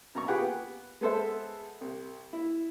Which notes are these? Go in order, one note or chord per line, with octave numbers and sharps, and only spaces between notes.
F#2 B2 A#5 C#6
F4 G4 G#4 B4 F#5 G5
B3
G#3 B3 A4 C5 E5
C2
E4